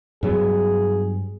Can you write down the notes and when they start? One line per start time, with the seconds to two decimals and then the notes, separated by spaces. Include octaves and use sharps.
0.23 G2 F#3 B3 G#4